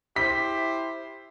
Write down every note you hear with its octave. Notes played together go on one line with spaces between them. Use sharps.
E4 G4 C5 B6